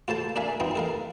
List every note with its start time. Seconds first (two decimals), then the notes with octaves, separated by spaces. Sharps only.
0.08 F4 A4 C5 A5
0.36 D4 A#4 E5 F5 G#5
0.60 E3 F3 C4 D#4 E4
0.75 A4 A#4 F5